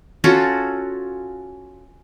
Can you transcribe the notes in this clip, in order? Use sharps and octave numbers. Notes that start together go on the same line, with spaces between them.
C#4 F4 F#4 A4